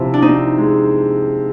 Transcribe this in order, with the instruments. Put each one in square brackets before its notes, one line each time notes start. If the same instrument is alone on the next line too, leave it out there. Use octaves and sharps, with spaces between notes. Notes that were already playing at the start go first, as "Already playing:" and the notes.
Already playing: [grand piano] C3 F3 [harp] E4
[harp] D4
[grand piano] C4 [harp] D#4
[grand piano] G#3